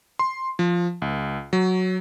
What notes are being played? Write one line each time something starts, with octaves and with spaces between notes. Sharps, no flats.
C6
F3
C#2
F#3